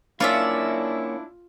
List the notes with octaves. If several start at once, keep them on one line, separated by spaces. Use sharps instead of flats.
A#3 C#4 D4 E4 F4 C#5 D5 E5